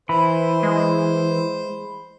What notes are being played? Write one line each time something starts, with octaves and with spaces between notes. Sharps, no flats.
E3 C5 B5
G#3